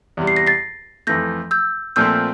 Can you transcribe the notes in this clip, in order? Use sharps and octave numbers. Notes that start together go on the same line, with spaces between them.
E2 C3 G3
C7
A#6
A6 C7
F2 E3 A3 G6 A#6
E6 G6
A#2 F3 A3 C4 E6 G6